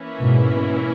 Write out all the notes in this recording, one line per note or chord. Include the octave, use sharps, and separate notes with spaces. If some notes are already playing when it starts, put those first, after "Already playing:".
Already playing: E3 A#3 C#4 E4
G#2 B2
G#2 B2